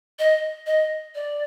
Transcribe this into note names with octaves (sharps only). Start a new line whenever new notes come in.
D#5
D#5
D5